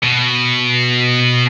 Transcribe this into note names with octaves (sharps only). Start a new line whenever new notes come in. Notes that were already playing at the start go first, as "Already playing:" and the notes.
B2